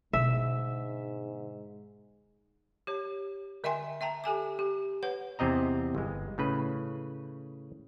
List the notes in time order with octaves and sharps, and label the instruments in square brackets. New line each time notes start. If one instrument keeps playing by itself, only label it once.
[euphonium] G#2 [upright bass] B2 D3 [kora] E5
[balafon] G4 C#5
D3 D#5 E5 G5 G#5 C6
E5 G5 A5 A#5
G4 A4 G#5 D6
G4
B4 C#5 F#5
[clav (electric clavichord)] E2 C3 C4 D#5 A#5
G1 G#3
A2 C#3 B4